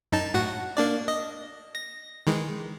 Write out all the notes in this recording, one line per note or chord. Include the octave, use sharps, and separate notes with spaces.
F#2 D#4 A5
A2 F#4 F#5
A#3 D4 D5
D#5
A#6
D#3 E3 G#3